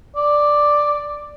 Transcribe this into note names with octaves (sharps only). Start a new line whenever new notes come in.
D5